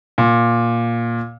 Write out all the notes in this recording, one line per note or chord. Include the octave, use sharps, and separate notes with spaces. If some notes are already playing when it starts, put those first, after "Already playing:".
A#2